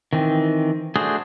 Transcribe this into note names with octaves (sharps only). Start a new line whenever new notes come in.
D#3 E3 C4
A3 D4 F#4 G#4 C5